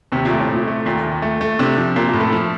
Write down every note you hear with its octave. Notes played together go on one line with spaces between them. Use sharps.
D#2 C3
A#2
A3
A2
A#2 A3
A3
D#2 A#2
D#2
A3
A3
C3 D4
F3
A#2 A#3
F3
A2
A3
F3